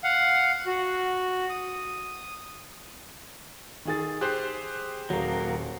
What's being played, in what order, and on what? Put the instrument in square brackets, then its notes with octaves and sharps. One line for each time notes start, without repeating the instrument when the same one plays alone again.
[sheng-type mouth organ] F5 F#5
F#4
D#6
[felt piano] D#3 G#4 A6
[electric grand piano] G4 G#4 C5 [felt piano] F#6 C7
[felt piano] D#1 [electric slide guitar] F#3 A#3